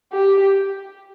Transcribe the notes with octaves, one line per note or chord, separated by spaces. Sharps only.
G4